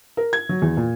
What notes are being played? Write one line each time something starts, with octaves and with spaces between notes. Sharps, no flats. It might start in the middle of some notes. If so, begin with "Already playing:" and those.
A#4
G#6
F#3
E2
A#2